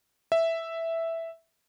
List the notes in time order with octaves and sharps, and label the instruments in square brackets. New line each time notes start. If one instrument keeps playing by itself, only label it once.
[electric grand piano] E5